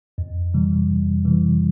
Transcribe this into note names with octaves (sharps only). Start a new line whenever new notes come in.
F2
C3 E3 G3
F2
C3 E3 G3